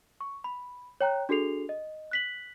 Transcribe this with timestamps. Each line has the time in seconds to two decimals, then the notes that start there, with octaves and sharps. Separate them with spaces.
0.21 C#6
0.44 B5
1.01 C#5 G5 A#5 F#6
1.29 D4 F#4 G#4 A4 C7 F7
1.69 D#5
2.11 F#6 B6 F#7